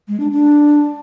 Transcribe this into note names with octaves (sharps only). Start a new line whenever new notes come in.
G#3
D4
D4